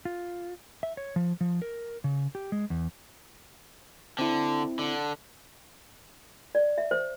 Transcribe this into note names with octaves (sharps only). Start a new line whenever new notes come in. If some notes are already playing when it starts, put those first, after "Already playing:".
F4
E5
C#5
F3
F3
A#4
C#3
G4
G#3
E2
D3 C4 E4
D3
D5
E5
C5